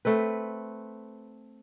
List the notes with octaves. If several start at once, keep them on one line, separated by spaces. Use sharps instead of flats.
A3 C4 B4